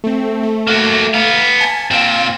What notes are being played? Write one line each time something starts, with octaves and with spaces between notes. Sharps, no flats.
A3 C4
A3
A#3 F#4
B3 F5
G#5 A5
A#2 C4 F5 E7